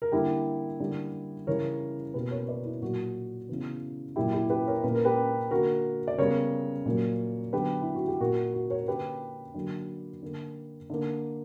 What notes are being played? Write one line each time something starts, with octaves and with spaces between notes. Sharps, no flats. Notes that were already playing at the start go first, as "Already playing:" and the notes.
A#4
D3 G3 A#3 E4 G4
D3 G3 A#3
C#3 E3 G3 A#4 C#5
B2 A#3 G4 B4
A#4 C#5
B4 D5
E4
A#2 F#3 A#3 F#4
C#3 E3 B3
A#2 F#3 A#3 E4 G4
E4 G4
G4 B4
A#4 C#5
A#2 A#3 B4
A#4
G4 B4
D3 A#3 F#4 A#4
D5
C#3 G3 B3 A#4 C#5
A#2 F#3 A#3
D3 F#3 B3 G4 B4
E4
F#4
G4
A#2 A#3 F#4 A#4
F#4
A#4 C#5
D3 A#3 G4 B4
D3 F#3 A#3
D3 A#3
D3 A#3